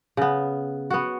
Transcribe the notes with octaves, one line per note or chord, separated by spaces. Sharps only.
C#3 B3
B3 F#4